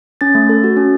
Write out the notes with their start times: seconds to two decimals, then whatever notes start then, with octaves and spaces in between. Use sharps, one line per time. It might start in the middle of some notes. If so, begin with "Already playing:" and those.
0.21 C#4 A6
0.35 A3
0.49 A4
0.64 F#4
0.77 C#4